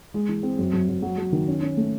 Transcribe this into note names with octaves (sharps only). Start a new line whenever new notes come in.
G#3
E3
C4
F#2
F#2
F#2
F#3
F#3
D#3
C#4
C#4
A3